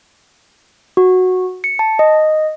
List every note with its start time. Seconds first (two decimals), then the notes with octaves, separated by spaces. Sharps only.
0.97 F#4
1.64 C#7
1.79 A5
1.99 D#5